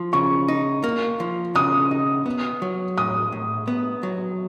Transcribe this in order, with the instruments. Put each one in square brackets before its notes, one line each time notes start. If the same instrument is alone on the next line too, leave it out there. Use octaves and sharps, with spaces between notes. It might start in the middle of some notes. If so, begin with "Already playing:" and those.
Already playing: [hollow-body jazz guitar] F3
[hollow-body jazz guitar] C#3 [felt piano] C#6
[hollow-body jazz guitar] D#4
A#3
F3
[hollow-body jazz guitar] C#3 [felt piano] D#6
[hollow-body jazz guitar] D#4
B3
F#3
[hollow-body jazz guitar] A2 [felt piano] D#6
[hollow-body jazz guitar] A2
B3
F#3